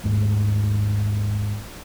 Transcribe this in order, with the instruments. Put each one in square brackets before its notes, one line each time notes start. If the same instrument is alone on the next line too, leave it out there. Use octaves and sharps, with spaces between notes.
[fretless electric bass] G#1 D#2 G#2 A3